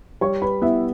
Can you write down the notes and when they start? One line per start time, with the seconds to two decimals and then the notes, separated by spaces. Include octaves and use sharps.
0.21 G3 C#5 C#6
0.42 B4 B5
0.62 B3 E4 E5